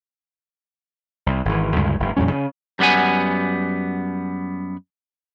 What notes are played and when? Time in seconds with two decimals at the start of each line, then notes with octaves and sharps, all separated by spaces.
1.26 C2
1.45 G#1 E3
1.76 D2 G2 C#3 G#3
2.00 F1 G2
2.17 F2 A#2 G3 C#4
2.31 C#3
2.79 F#2 G3 B3 F#5 G#5